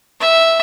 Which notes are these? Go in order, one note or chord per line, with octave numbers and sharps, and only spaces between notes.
E5